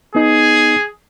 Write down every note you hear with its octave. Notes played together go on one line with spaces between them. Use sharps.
B3 D#4 G#4